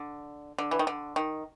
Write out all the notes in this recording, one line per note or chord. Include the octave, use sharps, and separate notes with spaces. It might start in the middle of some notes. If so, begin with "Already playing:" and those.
Already playing: D3
D3
E3
D#3
D3
D#3